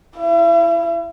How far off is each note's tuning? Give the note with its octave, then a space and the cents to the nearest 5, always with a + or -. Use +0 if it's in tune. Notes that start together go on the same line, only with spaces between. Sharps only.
E4 +10 E5 +45